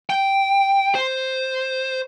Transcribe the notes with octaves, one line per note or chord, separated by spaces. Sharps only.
G5
C5